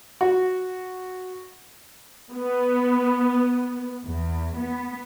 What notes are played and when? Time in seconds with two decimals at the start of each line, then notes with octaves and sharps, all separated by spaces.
0.21 F#4
2.32 B3
4.05 E2
4.57 B3